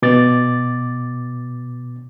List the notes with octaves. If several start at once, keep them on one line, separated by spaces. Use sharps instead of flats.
B2 D6 A6